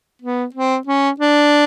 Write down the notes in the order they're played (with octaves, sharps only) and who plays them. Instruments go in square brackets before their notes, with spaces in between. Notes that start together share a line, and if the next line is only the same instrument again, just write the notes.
[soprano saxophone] B3
C4
C#4
D4